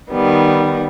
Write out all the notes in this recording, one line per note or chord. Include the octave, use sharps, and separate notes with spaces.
D#3 G3 B3